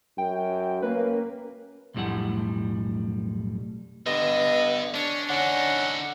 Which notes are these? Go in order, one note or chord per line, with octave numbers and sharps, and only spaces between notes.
F#2 G5
A#3 C#4 B4
B1 F2 A2 G3 A3 F#5
G2 D3 B3 D#5
C#4 D4
D3 C#4 D#4 F#5